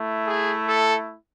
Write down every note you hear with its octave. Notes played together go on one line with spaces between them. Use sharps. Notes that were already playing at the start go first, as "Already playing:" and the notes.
Already playing: A3 E4
G#4
A4